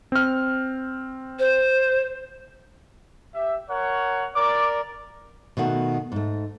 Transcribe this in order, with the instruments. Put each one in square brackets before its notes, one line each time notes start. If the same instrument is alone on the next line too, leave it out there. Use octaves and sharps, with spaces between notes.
[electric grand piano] C4 F6
[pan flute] C5
[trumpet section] G4 E5
A#4 C#5 F#5
[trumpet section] A#4 D5 [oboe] D6
[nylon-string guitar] B2 D#3 A3 F#4
G#2 A3